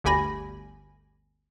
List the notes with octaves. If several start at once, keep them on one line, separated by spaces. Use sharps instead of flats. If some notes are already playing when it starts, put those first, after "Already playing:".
G1 D2 G4 G#5 B5 A#6